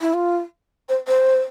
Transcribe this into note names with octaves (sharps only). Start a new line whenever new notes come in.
E4
F4
C5
C5